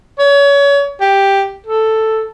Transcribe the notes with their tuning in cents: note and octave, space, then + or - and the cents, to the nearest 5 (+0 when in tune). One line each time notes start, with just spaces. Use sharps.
C#5 +30
G4 +5
A4 +5